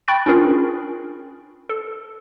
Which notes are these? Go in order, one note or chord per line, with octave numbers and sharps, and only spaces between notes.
G5 B5 C#6 F#6 A6 D7
C#4 D4 F4 G#4 A#4
A4